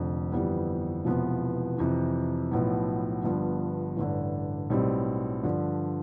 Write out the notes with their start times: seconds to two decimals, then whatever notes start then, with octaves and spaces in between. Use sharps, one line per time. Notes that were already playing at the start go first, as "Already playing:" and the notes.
Already playing: F1 F2 D3
0.32 G1 F2 E3 G3 B3
1.05 E1 E2 C3 F3 B3
1.78 F2 C3 E3
2.51 B1 A2 F3 B3
3.24 G1 G2 F3 B3
3.97 A1 G2 D3
4.70 B1 A2 G3 C4
5.43 G2 D3 F3